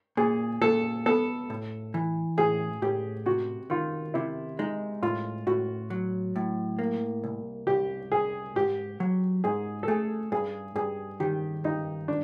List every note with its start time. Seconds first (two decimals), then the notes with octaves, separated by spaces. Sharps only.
0.17 A#2 G#4
0.61 A#2 A4
1.06 B3 A4
1.50 A2
1.94 E3
2.37 A2 G#4
2.82 A2 G4
3.26 C3 F#4
3.70 D#3 F4
4.14 C3 E4
4.59 G#3 D#4
5.03 A2 F4
5.47 A2 F#4
5.90 F#3
6.36 A2
6.79 A#3
7.24 C2
7.67 C2 G4
8.12 C2 G#4
8.56 G#2 G4
9.00 F#3
9.44 G#2 G#4
9.83 A4
9.88 A3 G#4
10.32 G2 G#4
10.76 G2 G#4
11.20 D#3 G4
11.64 G2 D#4
12.08 D4